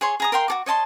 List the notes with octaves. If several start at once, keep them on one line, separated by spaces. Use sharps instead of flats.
G#4 C#5 C6
G#4 A#5 D#6
A#4 F5 G5 C6
F#4 A4 D6
C#5 D#5 A5 C6